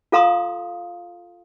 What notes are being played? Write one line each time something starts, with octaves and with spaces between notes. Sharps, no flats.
F4 A4 F5 A#5 C6 D#6